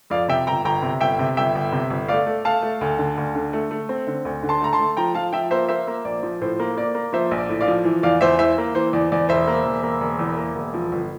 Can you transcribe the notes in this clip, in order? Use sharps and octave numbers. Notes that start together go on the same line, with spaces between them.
F2 D5 F5
C3 E5 G5
G1 G5 A#5
G1 G5 A#5
C3
G1 E5 G5
C3
G1 E5 G5
G1
C3
G1
A3 D5 F5
A3
A3 F5 A5
A3
D2
D3
D2
D3
A3
A3
C4
D3
D2
D3
A5 C6
A3 A#5
A5 C6
A3
F3 G5 A#5
F3 F5 A5
F3 E5 G5
A#3 C5 E5
A#3 C5 E5
A#3
A#1 D5
F3
A2 C5
A#3
A#3 D5
A#3
F3 C5 E5
A#1
D5
A2
D5 F5
F3
E3
E2 D5 F5
E2 C5 E5
E3 C5 E5
A#3
E3 C5
E2 D5
E2 D5
E1 C5 E5
A#3
E1
A#3
E1
E2
A#3
E1
F3
G1